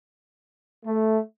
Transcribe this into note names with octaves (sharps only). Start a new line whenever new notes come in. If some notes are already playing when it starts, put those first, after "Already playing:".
A3